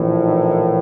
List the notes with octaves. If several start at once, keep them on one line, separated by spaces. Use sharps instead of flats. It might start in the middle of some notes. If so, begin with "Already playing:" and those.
Already playing: A#1 A2 E3
D#4